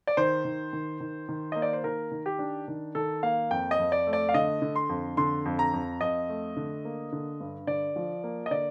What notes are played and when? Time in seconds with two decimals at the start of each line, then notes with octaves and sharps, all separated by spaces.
0.07 D5
0.17 D#3 C5
0.45 D#3
0.73 D#3
1.00 D#3
1.29 D#3
1.52 A#3 D#5
1.62 D5
1.73 C5
1.84 D#3 A#4
2.11 D#3
2.26 G4
2.39 D4
2.68 D#3
2.95 D#3 A4
3.23 A#3 F5
3.51 F2 G5
3.71 D#5
3.79 F2
3.92 D5
4.07 A3
4.13 D5
4.29 F5
4.34 D3 D#5
4.62 D3
4.76 C6
4.89 F2
5.17 D3 C6
5.45 F2
5.59 A#5
5.73 F2
6.01 F2 D#5
6.29 A3
6.56 D3
6.85 A#3
7.12 D3
7.40 G2
7.67 D3 D5
7.96 F3
8.24 A#3
8.46 D#5
8.51 D3 D5